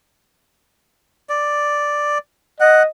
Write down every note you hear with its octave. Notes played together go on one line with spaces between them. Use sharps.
D5
D#5 F#5